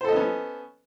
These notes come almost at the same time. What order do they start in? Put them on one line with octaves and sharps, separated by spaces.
C5 A4 D#5 B3 C#4